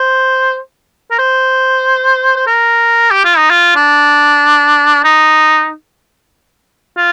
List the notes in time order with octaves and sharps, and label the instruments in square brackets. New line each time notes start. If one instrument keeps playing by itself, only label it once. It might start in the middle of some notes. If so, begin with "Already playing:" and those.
Already playing: [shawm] C5
A#4
C5
C5
A#4
G4
F4
D#4
F4
D4
D#4
F4